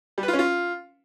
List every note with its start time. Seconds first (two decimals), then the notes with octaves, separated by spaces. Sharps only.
0.18 G3
0.23 B4
0.28 F4
0.34 C#4
0.39 F4